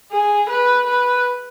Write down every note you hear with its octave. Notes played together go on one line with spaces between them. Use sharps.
G#4
B4
B4